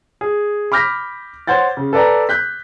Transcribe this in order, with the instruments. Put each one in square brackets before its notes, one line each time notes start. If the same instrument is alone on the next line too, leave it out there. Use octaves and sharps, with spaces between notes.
[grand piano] G#4
B5 D6 F6 G6 A#6 B6
C5 C#5 F#5 G6 A6
C#3
A4 B4 D5 G5 A#5
F#6 G6 B6